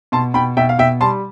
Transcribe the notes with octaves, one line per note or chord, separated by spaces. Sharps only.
B2 A5 C6
B2 G5 B5
B2 E5 G5
F5
B2 E5 G5
G3 A5 C6